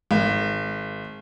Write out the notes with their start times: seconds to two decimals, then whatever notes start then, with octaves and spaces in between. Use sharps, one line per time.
0.11 G#1